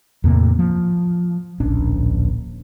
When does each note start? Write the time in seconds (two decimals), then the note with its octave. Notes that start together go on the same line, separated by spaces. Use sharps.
0.24 E2 A2 C3 A#3
0.59 F3
1.60 D1 A#1 C#4 D4